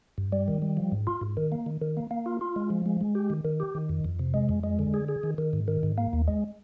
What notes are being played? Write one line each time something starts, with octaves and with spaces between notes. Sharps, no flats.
G2
G3
D#3
G3
F3
G#2
F4
G#2
D#3
A#3
D#3
D#3
A#3
A#3
F4
F4
G#3
F3
G#3
G#3
G4
D#3
D#3
G4
D#3
F2
F2
C3
G#3
F2
G#3
D3
G#4
G#4
D#3
D#3
G#2
D#3
G#2
A#3
D#2
G#3